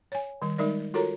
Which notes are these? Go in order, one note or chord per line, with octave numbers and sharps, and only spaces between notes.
C#5 G#5
D#3 G3
G3 G#3 D#4 A#4 D5
F4 F#4 A4 A#4 C#5 A#5